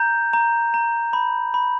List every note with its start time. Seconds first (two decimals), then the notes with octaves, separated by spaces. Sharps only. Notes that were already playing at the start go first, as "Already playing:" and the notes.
Already playing: A#5 G6
0.33 A#5
0.74 A#5
1.13 B5
1.54 B5